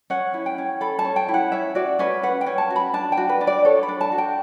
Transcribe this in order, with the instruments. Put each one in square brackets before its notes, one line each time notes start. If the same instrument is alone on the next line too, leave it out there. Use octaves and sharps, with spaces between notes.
[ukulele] C#4 F#5
E4
G5
C#4
A4 B5
A5
C#4
G5
E4
F#5
C#4 E5
F#4 D5
C#4 B4
B4 F#5
G5
C#4
A5
F#4
B5
D4 A5
G5
F#4
B4
D4
D5
A4 C#5
B5
D4
A5
F#4
G5